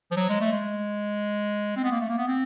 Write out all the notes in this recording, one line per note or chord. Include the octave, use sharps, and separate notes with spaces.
F3
F#3
G#3
A3
G#3
C4
B3
A#3
A3
A#3
B3
C4